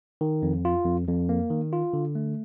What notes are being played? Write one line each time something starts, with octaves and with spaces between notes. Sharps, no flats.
D#3
F2
F4
F2
F2
A#3
D#3
F4
D3
A3